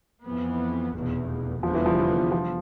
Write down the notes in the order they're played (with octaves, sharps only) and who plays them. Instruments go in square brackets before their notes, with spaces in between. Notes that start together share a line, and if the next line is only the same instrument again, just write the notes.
[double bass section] F2 E3 B3
F1 E2 B2
[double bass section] F1 E2 D3 G3 B3 [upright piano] F3
[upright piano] E3
F3
F3